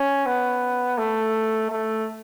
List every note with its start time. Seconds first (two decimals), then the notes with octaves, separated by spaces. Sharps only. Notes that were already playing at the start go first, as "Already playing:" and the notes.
Already playing: C#4
0.26 B3
0.98 A3
1.70 A3